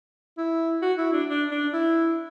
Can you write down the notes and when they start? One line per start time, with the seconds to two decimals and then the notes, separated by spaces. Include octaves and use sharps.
0.38 E4
0.82 F#4
0.98 E4
1.13 D4
1.28 D4
1.51 D4
1.73 E4